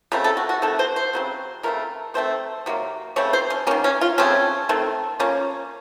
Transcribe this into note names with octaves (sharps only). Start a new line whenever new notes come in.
C#3 A3 C4 A#4
A4
F#4
F#4
D#3 A3 C4 A4
C5
C5
C#3 F#3 C4
C#3 A3 C4 A#4
D#3 A3 C4 C5
C3 F#3 A#3
C#3 A3 C4 C#5
C5
C#4
D#3 A#3 C#4
C#4
F4
C#3 F3 A3 C4 C#4
D#3 A3 C4
F3 A#3 C#4